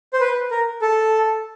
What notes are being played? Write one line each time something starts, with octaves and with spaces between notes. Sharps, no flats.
C5
B4
A#4
A4